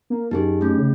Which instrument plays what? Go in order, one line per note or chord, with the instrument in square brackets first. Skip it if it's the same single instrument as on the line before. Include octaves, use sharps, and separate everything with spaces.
[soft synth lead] A#3
[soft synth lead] F#2 [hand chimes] D#4 G4 G#4
[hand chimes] A3 C#4
[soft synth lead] C#3